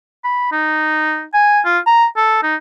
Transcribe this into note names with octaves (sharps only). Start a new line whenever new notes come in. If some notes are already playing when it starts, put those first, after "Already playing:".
B5
D#4
G#5
F4
A#5
A4
D#4